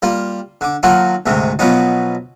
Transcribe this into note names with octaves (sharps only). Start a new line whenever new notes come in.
G3 A#3 F4
D3 D6
D#3 F#3 A#3 F4 F#4 A4
D2 G#2 C3 D#3
B2 F3 F#3 B3 C#4 D#4